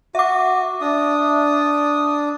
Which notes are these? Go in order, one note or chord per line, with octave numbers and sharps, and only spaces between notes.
F#4 E5 D6
D4 D#6